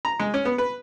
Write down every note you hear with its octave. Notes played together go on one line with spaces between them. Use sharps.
A#5
G#3
C#4
B3
B4